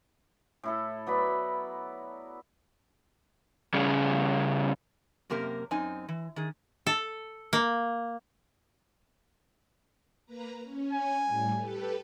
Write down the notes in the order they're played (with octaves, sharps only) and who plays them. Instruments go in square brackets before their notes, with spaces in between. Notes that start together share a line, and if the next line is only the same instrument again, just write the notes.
[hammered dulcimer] A2 E4 A4
F#3 B3 D5 B5
[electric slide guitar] C#3 G3 C#4 G#4
[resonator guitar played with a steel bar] F#2 C3 A#3 G4 A#4
F#2 C4 D#4 G#5
E3
D#3 G#4
[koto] A4
A#3
[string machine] A#3 B4 A#5
C#4
[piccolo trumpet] G#5
[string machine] A2 G3
G4 A4 B4